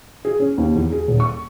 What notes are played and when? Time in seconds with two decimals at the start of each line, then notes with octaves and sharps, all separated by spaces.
0.25 G#4
0.40 C#4
0.58 D#2
0.75 E2
0.92 G#4
1.08 D#1
1.20 C#6